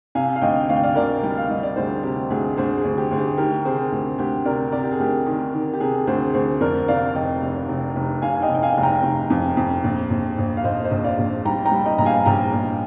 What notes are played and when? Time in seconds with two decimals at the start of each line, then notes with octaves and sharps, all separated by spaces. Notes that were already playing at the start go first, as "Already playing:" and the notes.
0.15 C3 F5 G#5
0.36 F5
0.42 D2 D#5 G5
0.69 D2 F5
0.76 G5
0.83 D5 F5
0.95 D2 A#4 D5
1.23 G3 G5
1.37 F5
1.50 G3 D#5
1.63 D5
1.76 D2 G#4 C5
2.03 C3 G4
2.30 D2 G#4
2.57 D2 G#4 C5
2.78 G#4
2.84 D2
2.98 G4
3.11 D2 G#4
3.18 G4
3.38 D#3 G4 A#4
3.65 C3 G#4 C5
3.92 D2
4.18 D2 G4
4.45 C3 A#4 D5
4.72 C3 A#4 D5
4.84 G4
4.92 G#4
5.00 D2 G4 A#4
5.26 D#3
5.54 D#3
5.73 G4
5.80 C3 G#4
6.07 D2 G#4 C5
6.33 D2 G#4 C5
6.60 F2 A#4 D5
6.88 C3 D5 F5
7.15 F1 D#5 G5
7.42 F1
7.69 F1
7.96 F1
8.22 F1 F5 G#5
8.35 G#5
8.42 D#5 G5
8.49 F1
8.55 G5
8.62 F5 G#5
8.77 F1
8.83 G5 A#5
9.03 F1
9.30 F2
9.57 F2
9.84 A#1
10.10 A#1
10.38 A#1
10.57 F5
10.64 A#1 C5 D#5
10.84 C5 D#5
10.91 A#1
11.04 D5 F5
11.19 A#1
11.45 G3 G5 A#5
11.66 G5 A#5
11.72 G3
11.86 D#5 G5
11.98 A#1 A#5
12.06 F5 G#5
12.26 A#1 G5 A#5
12.52 A#1